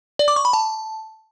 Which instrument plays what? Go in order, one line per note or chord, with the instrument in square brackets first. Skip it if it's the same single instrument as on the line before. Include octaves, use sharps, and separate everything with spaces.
[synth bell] D5
D6
C#6
B5
A5